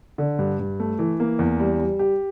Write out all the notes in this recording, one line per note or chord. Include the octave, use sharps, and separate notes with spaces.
D3
G2
G2
A3
E3
A#3
E2
G3
G3
G4